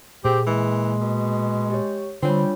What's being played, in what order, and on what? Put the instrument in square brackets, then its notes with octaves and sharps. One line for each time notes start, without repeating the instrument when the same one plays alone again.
[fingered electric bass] A#2 [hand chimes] A#3 G#4 [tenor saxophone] C4 [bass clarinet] G4
[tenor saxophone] E3 [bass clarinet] G#3
[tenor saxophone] B2
[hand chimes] G4 C#5
[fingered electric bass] D3 [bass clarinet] G3 [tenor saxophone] C4 [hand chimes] D4 F4 C#5